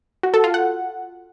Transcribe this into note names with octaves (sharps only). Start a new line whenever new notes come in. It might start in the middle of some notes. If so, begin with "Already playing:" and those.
F#4
A4
F4
F#5